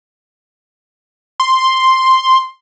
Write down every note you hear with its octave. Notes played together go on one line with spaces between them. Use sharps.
C6